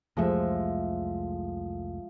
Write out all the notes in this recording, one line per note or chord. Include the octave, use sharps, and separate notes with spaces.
C2 F2 F3 G#3 A3 E5